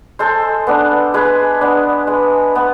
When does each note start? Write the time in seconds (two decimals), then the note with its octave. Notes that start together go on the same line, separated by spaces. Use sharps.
0.19 G#3 A4 C5
0.67 B3 D4
1.14 G#3 G#4 B4
1.61 B3 D4
2.07 G#3
2.55 B3